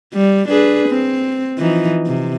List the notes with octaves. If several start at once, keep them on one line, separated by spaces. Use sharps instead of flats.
G3
D4 G#4 B4
C4
E3 F3 D#4
C3